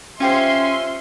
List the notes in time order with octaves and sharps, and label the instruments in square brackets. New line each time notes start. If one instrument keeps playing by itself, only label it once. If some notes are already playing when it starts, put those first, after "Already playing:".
[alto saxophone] C#4 [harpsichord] F4 G4 C5 [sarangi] E5 [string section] C6